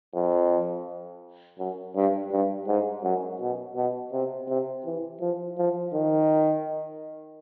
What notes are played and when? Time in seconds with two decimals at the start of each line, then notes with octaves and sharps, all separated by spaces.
0.14 F2
1.59 F#2
1.95 G2
2.32 G2
2.68 G#2
3.04 F#2
3.40 B2
3.76 B2
4.13 C3
4.48 C3
4.86 E3
5.21 F3
5.58 F3
5.94 D#3